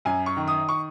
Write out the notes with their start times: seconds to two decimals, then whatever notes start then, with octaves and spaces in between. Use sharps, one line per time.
0.05 F#2 G#5
0.26 C#6
0.37 D#3
0.48 D#6
0.69 C#6